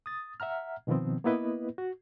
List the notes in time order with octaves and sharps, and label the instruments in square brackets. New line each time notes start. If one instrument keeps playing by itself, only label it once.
[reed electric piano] D#6 A6
E5 F#5 A#5 F6
B2 D#3 F3 B3 C4
A#3 B3 E4 B4 D#5
F#4